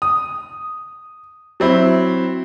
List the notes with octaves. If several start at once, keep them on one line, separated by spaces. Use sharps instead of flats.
D#6
F#3 C4 E4